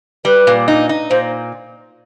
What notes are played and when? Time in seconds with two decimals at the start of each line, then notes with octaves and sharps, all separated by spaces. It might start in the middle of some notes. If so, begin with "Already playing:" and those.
0.25 G3 B4
0.47 A#2
0.68 D#4
0.89 D#4
1.10 A#2 C5